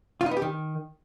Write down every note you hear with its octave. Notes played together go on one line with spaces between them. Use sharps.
F4
D#4
B3
G4
D#3